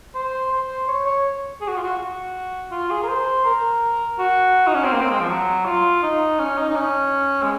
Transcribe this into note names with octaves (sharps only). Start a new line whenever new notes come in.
C5
C5
C#5
C#5
G#4
F#4
F4
F#4
F#4
F4
G#4
A#4
C5
A#4
F#4
D#4
C#4
C4
A#3
C4
G#3
F3
F#3
F4
D#4
C#4
D#4
D#4
C#4
G#3